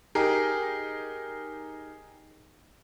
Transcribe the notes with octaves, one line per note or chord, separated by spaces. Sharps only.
D#4 G4 G#4 A#4